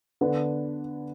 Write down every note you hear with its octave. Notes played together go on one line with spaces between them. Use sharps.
D3 B3 D4 B4